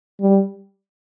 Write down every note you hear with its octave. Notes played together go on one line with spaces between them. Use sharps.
G3